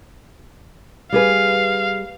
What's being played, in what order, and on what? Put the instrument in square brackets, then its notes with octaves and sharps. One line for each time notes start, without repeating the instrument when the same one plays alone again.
[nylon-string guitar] G3 G#4 B4 [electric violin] F5